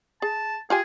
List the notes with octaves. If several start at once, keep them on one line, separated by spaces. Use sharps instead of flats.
G#4 A5
F4 G4 G#4 G#5